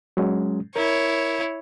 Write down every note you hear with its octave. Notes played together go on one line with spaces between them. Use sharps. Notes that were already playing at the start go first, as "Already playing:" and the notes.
F#3 G#3 C#4
E4 A#4 C#5